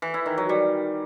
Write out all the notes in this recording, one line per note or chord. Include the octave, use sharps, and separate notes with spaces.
E3
E4
D#3
F#3
G3